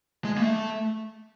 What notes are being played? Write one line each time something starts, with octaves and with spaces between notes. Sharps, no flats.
G#3
A#3
A3